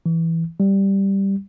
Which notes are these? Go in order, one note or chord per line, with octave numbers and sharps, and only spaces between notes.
E3
G3